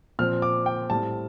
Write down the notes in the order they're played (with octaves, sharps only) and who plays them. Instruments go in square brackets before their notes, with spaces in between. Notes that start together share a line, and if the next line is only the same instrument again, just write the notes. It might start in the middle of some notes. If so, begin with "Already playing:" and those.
[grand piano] A#2 F3 C4 F6
D6
G5
A2 G3 C4 A5